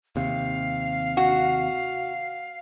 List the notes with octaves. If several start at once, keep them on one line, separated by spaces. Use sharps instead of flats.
D#2 C3 F5
F#4